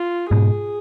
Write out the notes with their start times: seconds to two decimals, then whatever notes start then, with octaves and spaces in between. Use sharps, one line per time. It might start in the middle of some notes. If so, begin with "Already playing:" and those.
Already playing: F4
0.31 G#2 B2 G#4